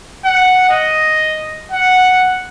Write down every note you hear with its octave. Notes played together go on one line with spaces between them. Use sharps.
F#5
D#5
F#5